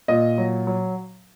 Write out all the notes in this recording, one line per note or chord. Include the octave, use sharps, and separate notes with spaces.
A#2 D#5
F#3
F#3